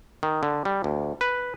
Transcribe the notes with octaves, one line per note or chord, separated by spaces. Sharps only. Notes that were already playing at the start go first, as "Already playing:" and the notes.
D#3
D3
G3
D2
B4